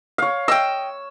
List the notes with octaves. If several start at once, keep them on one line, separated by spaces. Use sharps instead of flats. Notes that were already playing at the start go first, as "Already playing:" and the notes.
C#5 F5
D#5 G5 E6